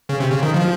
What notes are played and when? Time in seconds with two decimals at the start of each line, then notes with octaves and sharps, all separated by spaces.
0.09 C#3
0.20 C3
0.32 C#3
0.43 D#3
0.54 F3